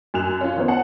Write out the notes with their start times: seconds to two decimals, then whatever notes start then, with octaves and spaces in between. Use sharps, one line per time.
0.14 F#2 G#5 F#6 E7 F7
0.41 C#4 F4
0.57 D#3 B3 C5 C#5
0.68 F#5 G#5 A5